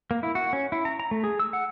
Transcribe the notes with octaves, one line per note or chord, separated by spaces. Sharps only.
A#3
E4
F#4
C#4
E4
A#5
A#5
A3
G#4
E6
F#5